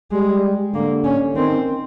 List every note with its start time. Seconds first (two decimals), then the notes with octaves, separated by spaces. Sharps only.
0.11 G3 G#3
0.74 D3 A#3
1.04 C#4
1.36 D#3 C4